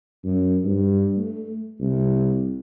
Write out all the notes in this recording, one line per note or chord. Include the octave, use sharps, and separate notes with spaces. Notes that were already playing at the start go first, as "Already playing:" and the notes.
F#2
G2
A3
C2